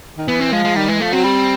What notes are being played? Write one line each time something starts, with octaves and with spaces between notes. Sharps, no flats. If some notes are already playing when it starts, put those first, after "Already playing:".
D#3
E3 B3
C4
F3 G#3
G#3
D#3 G3
E3 G#3
F3 A3
F#3 C4
G3